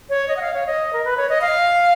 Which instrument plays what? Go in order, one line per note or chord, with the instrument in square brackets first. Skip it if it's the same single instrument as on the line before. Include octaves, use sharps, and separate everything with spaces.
[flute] C#5
D#5
F#5
F5
C#5
D#5
A#4
B4
C#5
D#5
F5